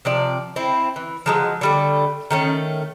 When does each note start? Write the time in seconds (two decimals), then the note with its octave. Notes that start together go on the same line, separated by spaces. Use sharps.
0.05 C3 F3 D5
0.56 C4 E4
0.96 E3
1.26 F3 F#3 G#3
1.61 D3 G3 A3
2.30 D#3 A3 C#4